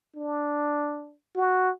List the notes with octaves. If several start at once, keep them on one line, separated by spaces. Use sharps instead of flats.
D4
F#4